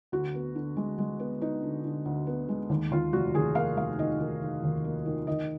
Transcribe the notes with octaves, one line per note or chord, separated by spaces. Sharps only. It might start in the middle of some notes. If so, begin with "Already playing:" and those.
D2 F#4
B3
D3
G#3
G#3
B3
B3 D#4
D3
D3
D2
B3
G#3
D#2
D#2 F4
F1 F#4
D#2 G#4
A#3 F5
F1 F5
D#3 D#5
D#3
D#3
D#2
A#3
D#3
D#3 D#5